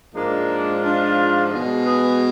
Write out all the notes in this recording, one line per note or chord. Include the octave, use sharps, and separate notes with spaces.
G#2 F3 G#3 A#3 D4
D4 F4
B2 G#3
G#4 B4